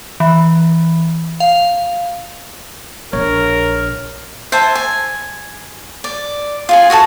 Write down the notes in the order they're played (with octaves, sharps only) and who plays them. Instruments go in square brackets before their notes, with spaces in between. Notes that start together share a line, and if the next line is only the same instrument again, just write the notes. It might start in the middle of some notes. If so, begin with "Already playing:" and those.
[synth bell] E3
F5
[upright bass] A#1 [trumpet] A#4 [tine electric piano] C#5
[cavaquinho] C5 E5 G#5 A5
G#5
D5
F4 G#4 G#5
F#4 G#4 A4 A5